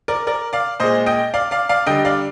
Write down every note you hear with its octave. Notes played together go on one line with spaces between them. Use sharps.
A#4 D5
A#4 D5
D5 F5
A#2 G#3 C5 D#5
D#5 G5
D5 F5
D5 F5
D5 F5
D3 G3 D#5 G5
D5 F5